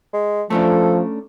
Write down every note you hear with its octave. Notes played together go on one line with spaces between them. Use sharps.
G#3
F3 A3 C#4 D4 A4